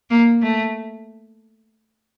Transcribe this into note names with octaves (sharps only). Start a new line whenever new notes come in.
A#3
A3